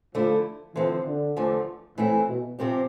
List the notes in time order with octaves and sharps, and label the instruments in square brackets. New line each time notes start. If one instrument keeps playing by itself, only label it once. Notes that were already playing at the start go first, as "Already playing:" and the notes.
[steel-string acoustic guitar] D3 A3 E4 [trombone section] F3
[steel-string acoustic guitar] D3 F3 C4 [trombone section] E3
[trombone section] D3
[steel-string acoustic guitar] E2 D3 F3 A3
[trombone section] A2 [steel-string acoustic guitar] E3 A3 C4 E4
[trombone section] B2
[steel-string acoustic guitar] C3 F3 C4 G4